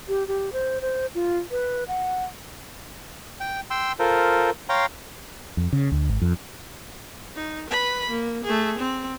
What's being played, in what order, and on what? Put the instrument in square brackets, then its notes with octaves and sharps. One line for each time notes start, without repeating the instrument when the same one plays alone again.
[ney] G4
G4
C5
C5
F4
B4
F#5
[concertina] G5
G5 C6 E6
F4 A4 A#4 C5
C#5 F5 G5 A#5 C6
[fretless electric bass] F2
C#3
D2
G#1
F2
[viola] D#4
B4 B5
A#3
A3 G#4
C4